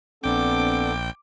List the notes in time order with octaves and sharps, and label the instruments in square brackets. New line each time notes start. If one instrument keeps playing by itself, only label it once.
[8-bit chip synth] A#1 G5 [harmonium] B3 D4 A4 [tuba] C4 [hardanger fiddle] D6